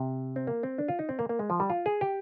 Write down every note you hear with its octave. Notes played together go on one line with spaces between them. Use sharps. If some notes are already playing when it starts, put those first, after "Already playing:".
Already playing: C3
C4
A#3
C4
D4
F4
D#4
C4
A#3
A#3
G#3
F3
G3
F4
G#4
G4